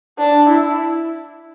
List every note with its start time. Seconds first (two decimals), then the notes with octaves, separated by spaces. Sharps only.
0.19 D4
0.49 E4